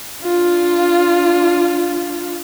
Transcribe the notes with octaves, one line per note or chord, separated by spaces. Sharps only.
D4 F4